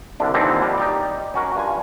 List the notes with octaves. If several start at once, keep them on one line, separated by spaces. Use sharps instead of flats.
C2 D3 D4
D#2 D3 E3 F3 C4 D#4
G3
D#4 G4 D5
C#4 F#4 A#4
G2 F4 G#5